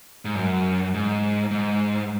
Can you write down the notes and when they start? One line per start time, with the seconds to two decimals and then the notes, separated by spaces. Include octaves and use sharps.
0.25 G#2
0.36 F#2
0.94 G#2
1.51 G#2